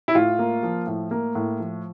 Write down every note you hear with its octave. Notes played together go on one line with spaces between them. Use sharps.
E4
A2 F4
A#3
F3
A2
A#3
A2
F3